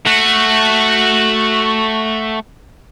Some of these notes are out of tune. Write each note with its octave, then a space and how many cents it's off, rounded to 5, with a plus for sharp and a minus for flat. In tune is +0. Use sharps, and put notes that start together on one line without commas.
A3 +0 F#4 +0